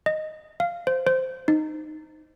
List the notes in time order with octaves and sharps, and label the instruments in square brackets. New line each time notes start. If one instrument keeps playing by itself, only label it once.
[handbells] D#5
F5
C5
C5
D#4